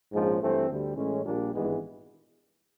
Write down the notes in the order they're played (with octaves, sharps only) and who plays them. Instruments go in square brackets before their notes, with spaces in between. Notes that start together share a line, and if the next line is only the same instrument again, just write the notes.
[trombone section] A#1 G#2 F3 G#3 C#4
G2 E3 A3 C4
D2 D3 G3
A2 E3 G#3 C#4
A#1 A#2 G3 A#3 D4
G#1 G2 E3 G#3 B3